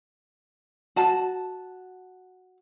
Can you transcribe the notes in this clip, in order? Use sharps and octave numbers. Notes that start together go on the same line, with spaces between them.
F#4 A5